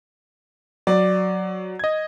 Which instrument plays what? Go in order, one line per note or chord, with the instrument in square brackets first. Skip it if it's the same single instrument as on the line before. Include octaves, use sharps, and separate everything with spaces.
[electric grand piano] F#3 [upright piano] D5
[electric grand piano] D#5 G#6